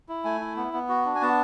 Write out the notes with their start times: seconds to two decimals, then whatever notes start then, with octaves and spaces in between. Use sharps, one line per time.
0.09 E4
0.24 A3 G#5
0.40 E4
0.57 B3
0.73 B3
0.89 F#4
1.06 D4
1.15 G#5
1.22 B3 A5